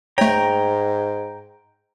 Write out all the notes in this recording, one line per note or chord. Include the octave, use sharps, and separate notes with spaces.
G#2 A3 C#5 G5 A#5